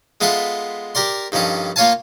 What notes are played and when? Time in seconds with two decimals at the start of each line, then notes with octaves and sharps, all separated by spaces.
0.21 G#3 B3 F4 A4 E5 C6
0.95 G4 A#4 D5 C6
1.32 G2 D#3 F3 C#4 A4
1.76 A#3 F4 C#5 F5 G#5 A5